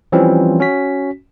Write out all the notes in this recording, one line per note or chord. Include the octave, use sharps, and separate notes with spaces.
E3 F3 G3 C4 C#4 F4
C#4 F#4 B6